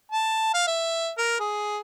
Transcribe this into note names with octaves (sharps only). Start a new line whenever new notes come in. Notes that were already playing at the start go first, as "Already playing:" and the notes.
A5
F5
E5
A#4
G#4